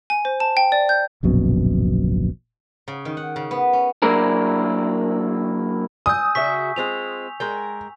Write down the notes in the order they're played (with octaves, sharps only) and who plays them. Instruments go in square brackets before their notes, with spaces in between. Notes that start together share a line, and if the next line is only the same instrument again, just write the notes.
[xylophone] G#5
C5
A5
G5
D5
G6
[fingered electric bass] D1 A#1 F#2 B2
[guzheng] C#3
D#3
F#5
C#3
B3
C#4
[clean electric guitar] F#3 A#3 D4 E4 G#4 A#4
[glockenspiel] G#5 E6 G6 [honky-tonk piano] D#6
[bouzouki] C#3 F#4 E5 [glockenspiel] C#6 B6
[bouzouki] G#3 C4 F4 [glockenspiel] F7
[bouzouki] G#3 A#4 G5